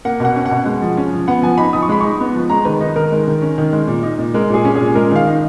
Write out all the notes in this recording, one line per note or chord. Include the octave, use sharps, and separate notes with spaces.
A#3 F#5
B2 F#5
C#4
F#5
B2
G#3
F3
C#4
F3
B3 F#5
F3 G#5
D#4 B5
F3 D#6
C#6
G#3 B5
D#4 C#6
B3
F3
G#3 A#5
D#3 B4
D#4
D#3 A#4
G#3
D#3
C#4
D#3
G#3
A#2
D#4
A#2
G#3 A#4
A#2 G#4
C#4
G#4
A#2
G#3 A#4
D#3 F5
D#4